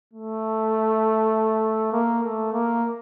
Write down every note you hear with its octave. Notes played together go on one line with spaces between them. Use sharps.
A3
A#3
A3
A#3